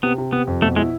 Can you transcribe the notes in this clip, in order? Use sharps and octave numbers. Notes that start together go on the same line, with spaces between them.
C3 B3
C3
C3 B3
F2
B2 A3
G#3 E4